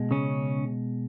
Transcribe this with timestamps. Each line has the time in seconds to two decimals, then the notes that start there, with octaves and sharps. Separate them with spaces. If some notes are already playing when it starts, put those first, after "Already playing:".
Already playing: B2 G#3
0.11 C#3 C#4